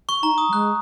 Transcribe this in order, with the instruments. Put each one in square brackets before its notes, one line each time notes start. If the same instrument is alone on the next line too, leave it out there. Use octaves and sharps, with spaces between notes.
[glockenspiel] C#6
[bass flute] D#4 [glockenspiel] A#5
[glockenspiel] D#6
[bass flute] F#3
[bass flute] G#3 [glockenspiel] F#6